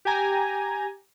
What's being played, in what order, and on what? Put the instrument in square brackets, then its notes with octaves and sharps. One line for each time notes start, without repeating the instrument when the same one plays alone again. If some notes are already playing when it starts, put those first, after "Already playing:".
[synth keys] G4 G5 G#5 A#5